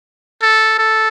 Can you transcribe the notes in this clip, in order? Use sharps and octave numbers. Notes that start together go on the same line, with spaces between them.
A4
A4